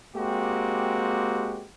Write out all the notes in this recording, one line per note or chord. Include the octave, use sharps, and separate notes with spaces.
G#3 A#3 C4 F#4 G4